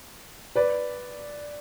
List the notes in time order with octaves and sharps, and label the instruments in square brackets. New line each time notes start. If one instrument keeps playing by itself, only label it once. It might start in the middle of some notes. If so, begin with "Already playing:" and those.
[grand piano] B4 D5